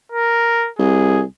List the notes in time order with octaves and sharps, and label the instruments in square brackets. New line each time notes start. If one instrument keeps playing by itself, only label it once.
[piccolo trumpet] A#4
[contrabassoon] C2 [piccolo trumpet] G#4